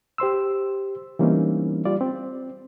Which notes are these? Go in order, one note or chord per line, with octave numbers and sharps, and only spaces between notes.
G4 C5 C6 E6
E3 G3 A#3 C4 C#4 D#4
G3 F4 D5
C4